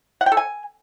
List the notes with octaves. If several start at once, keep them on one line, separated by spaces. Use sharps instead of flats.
F#5
G5
A4
G#5